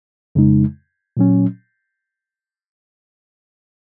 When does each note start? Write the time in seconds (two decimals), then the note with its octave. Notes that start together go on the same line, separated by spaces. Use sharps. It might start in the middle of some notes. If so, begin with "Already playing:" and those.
0.35 F2 C#3 G#3 D#4
1.17 A#2 F#3 C#4